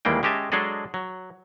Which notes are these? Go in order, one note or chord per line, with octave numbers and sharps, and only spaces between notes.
D#2 E3 G3 G#3 A#3 G5
G#3 C#4 G4 D#5 E5 A5
F#3 G#3 D4 G#4 A4 D#5
F#3